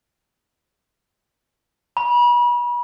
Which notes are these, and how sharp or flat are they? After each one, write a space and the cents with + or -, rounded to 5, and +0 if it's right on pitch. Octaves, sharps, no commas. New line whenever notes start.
B5 -35